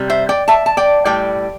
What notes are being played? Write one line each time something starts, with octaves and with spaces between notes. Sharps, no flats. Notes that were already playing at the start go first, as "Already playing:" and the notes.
Already playing: C3 G3
C5 E5
D5 G5
E5 A5
A5
D5 G5
A2 G3 D5 G5